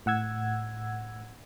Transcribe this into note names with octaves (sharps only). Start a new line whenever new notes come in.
A2 F#5 E6 G#6